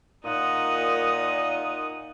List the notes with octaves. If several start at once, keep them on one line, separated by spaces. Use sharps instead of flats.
A#2 D#4 F#5 D#6